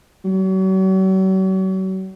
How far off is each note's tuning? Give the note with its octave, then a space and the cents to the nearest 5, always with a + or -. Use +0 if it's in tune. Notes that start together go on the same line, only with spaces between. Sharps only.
F#3 +40